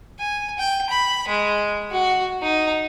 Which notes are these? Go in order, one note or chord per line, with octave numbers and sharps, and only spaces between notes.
G#5
G5
B5
G#3
F#4
D#4